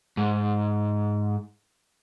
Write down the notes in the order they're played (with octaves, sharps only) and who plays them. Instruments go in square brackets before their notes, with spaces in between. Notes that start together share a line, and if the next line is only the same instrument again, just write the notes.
[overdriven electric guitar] G#2